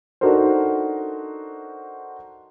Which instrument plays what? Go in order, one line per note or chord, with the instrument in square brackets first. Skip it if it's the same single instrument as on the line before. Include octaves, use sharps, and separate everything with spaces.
[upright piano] D4 D#4 F#4 A4 A#4 C5